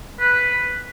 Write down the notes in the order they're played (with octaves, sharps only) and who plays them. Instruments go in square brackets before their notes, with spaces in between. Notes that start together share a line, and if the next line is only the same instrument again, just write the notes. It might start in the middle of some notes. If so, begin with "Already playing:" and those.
[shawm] B4